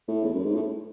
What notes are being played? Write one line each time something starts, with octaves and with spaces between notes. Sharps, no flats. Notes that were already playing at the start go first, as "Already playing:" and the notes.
A2
E2
F#2
G#2
A2